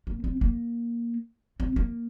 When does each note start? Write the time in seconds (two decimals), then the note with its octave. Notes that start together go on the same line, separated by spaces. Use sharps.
0.07 A#3
0.24 C4
0.41 A#3
1.60 C4
1.76 A#3